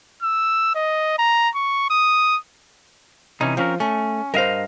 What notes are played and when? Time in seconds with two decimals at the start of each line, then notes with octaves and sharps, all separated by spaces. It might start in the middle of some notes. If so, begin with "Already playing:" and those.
0.23 E6
0.75 D#5
1.18 A#5
1.55 C#6
1.90 D#6
3.41 C3 E3 C#4 D#4
3.57 F3 C4 C#4 A#4
3.80 A3 C#4
4.34 G2 A#4 C5 D#5 F5